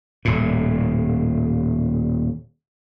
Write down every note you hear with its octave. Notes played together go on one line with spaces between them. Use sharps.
D#1 A2